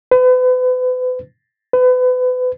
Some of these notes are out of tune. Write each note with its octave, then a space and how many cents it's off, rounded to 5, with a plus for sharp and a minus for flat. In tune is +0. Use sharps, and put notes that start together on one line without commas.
B4 +40
B4 +35